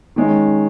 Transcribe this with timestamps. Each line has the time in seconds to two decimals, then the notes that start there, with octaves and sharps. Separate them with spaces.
0.16 D#3 G#3 C#4